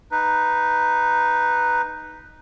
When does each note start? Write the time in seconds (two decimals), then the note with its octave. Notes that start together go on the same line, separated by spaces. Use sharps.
0.11 D#4 B4